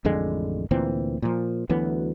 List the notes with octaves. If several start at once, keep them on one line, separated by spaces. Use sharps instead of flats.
A1 F2 D3 G#3
D2 A#2 E3 C4
A#2 F3
D2 E3 F#3 B3